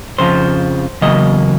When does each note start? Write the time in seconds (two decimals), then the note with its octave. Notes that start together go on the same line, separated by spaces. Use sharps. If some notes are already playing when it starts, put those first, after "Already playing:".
0.18 F2 C#3 F3 C5
1.01 E2 C#3 F#3 A#3 D#5